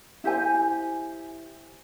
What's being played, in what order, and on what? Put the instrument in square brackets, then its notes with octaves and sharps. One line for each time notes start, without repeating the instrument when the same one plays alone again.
[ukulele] E4 G4 C5 G#5